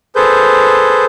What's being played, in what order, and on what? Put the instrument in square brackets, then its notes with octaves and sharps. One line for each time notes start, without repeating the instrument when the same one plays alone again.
[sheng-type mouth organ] G#4 A4 B4 C5 G6